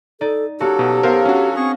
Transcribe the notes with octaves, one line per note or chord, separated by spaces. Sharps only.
D#4 A4 D5
F#3 A#3 C#4 F#4 G4 A4
B2
B3 A#4 C5 F5
C#4 D4 F#4
C4 G#4 C#6